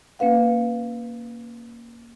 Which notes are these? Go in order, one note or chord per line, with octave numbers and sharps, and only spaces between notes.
A#3 C#4 B4 F5 F#5